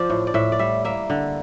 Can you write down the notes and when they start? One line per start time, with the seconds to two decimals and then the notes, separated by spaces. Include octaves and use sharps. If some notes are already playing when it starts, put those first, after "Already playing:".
Already playing: F3 C5 D5
0.10 A2
0.27 D5
0.34 A2 E5
0.52 D5
0.59 G3 E5
0.85 A#3 E5
1.10 D3